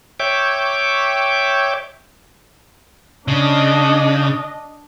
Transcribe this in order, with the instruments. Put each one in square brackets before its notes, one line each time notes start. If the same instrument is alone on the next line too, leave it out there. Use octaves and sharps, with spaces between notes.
[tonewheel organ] C#5 E5 G5 D6
[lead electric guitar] C#3 [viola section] D4 D#5